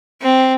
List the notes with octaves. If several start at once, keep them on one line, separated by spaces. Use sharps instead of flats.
C4